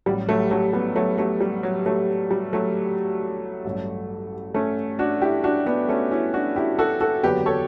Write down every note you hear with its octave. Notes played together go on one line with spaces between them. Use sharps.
A1 A2 F#3 G3
F#3 A3
F#3 A3
G3 B3
F#3 A3
F#3 A3
G3
F#3
F#3 A3
G3
F#3 A3
A1 G2 F#3
A3 C#4
D4 F#4
E4 G4
D4 F#4
B3 D4
A3 C#4
C#4 E4
D4 F#4
E4 G4
F#4 A4
F#4 A4
F#1 E2 D3 F#3 G4 B4
A4 C#5